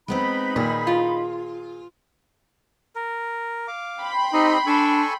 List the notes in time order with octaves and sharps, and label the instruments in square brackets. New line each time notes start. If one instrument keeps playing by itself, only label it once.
[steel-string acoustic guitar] G#3 B3 C4 [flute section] D#4 B5
[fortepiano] A#2 D#3 [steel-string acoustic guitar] G#4
[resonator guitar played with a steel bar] F4
[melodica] A#4
F5 D6
[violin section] G5 B5 C6
[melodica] C4 G4 D#5 [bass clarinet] D#4
[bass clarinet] D4 [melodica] A4 G#5 C#6